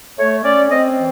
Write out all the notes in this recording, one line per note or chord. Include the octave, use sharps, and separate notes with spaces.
A3 C#5
C#4 D5
C4 D#5
E3